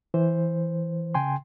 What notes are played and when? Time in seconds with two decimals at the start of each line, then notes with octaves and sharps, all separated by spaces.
0.14 E3 C5
1.14 C#3 G5 G#5 C6